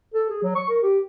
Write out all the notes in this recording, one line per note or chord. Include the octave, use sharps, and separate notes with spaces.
A4
G#4
F#3
C#6
A#4
G4